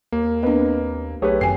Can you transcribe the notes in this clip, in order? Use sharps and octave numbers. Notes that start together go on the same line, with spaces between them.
D#2 A#3
B3 C4 D4 B4 D#5
B1 A3 G4 G#4 B4 C#5
G#1 F#2 G5 G#5 C7